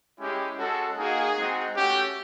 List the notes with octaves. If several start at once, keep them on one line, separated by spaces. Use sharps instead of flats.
G#3 C#4 E4 G4
G#3 C#4 F#4 A4
A#3 D#4 F#4 G#4
G#3 C4 D#4 F#4
A3 C#4 F#4 G4